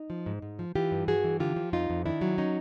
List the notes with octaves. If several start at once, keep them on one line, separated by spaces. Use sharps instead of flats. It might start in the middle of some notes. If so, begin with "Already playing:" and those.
Already playing: D#4
F3
G#2
G#2
F3
E3 F4 G4
G2
G2 F#4 G#4
E3
D3 F4 G4
F3
F2 D#4 F4
F2
D#3 D4 E4
F#3
C#4 D#4